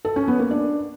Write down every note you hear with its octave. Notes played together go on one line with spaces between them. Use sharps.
A4
C#4
B3
A#3
D4